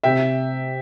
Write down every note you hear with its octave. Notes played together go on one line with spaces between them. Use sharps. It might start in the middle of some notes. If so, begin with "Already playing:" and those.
C3 E5 G5